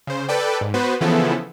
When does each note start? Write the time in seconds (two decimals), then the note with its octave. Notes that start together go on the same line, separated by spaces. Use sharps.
0.07 C#3 C5
0.29 A4 B4 D5 G5
0.61 G#2
0.74 B3 F#4 B4 C5
1.01 C#3 E3 F3 B3 E4 A4